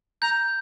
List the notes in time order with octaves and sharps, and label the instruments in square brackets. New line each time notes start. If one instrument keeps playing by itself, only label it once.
[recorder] A#5 [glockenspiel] G6